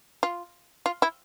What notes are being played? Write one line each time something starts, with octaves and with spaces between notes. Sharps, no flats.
F4
F4
E4